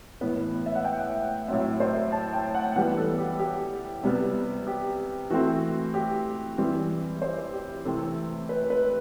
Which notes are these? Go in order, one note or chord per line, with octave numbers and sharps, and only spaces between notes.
A2 E3 B3 B4
E5
F#5
G5
A2 F#3 C4 E5
C5
A5
G5
F#5
E3 G3 B3 F#5
A4
G4
G4
C3 G3 B3
G4
E3 A3 C4 F#4
G4
E3 G3 C4
C5
G4
C3 E3 A3 C4 A4
B4
B4